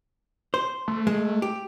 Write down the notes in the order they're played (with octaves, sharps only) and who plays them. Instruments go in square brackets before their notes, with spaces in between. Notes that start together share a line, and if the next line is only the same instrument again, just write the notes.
[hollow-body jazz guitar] C5
[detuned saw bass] A3
[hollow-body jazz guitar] G#3
G4